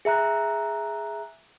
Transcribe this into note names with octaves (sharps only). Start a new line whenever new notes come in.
G#4 E5 A#5 F#6